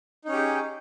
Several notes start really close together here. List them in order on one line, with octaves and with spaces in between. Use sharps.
D#4 C#4 G4 G#4